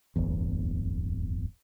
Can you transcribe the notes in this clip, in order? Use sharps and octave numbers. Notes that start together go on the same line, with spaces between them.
D1 G1 E2